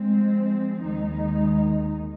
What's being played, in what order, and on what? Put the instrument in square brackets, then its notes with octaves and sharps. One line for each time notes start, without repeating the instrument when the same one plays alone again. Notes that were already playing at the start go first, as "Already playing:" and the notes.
Already playing: [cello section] F3 G#3 C4
D#2 D#3 G#3 D#4